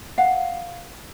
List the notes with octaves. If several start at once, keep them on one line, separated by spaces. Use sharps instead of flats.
F5 F#5